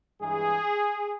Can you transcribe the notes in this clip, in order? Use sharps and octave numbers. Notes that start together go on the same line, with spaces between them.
G2 E3 G#3 G#4